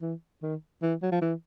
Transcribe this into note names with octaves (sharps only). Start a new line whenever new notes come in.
E3
D#3
E3
F#3
F3
E3